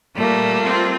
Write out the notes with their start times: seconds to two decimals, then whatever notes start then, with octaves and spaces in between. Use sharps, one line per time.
0.16 A#2 G3 A3 A#3
0.62 C4 F4